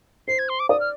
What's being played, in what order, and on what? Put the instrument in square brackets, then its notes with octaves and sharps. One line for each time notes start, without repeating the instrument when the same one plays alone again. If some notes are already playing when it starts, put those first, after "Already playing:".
[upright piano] C5 [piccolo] C7
[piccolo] G#6
C6
D6
[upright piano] D5 [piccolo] D#6
[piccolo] F6